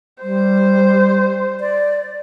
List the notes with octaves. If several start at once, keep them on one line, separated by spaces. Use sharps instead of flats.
G3 C5
D5